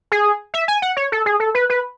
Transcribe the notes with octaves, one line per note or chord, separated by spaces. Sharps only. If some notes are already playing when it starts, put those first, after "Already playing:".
G#4
E5
G#5
F#5
C#5
A4
G#4
A4
B4
B4